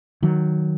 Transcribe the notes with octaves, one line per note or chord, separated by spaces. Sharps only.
D#3 F#3